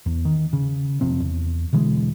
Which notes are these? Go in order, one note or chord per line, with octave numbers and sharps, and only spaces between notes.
E2
D#3
C#3
F#1 F2 C3 C4
E2
B2 D3 E3 G#3